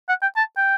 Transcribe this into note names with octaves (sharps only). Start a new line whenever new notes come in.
F#5
G5
A5
G5